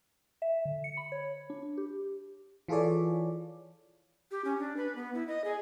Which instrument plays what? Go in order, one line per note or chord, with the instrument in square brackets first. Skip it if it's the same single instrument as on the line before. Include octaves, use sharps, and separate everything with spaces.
[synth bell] E5
D3
C#7
B5
C#5
D4
G4
[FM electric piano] E3 F4 G#4 A4 C#5 D5
[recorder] G4
C#4
D4
B4
B3
E4
D#5
G#4